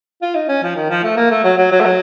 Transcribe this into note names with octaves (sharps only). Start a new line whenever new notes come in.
F4
D#4
C#4
F3
D#3
F3
A3
A#3
A3
F#3
F#3
F#3
A3
F#3